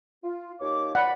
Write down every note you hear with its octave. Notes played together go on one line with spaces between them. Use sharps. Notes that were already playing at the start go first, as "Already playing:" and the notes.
F4
D#2 C#5 D6
D5 F#5 B5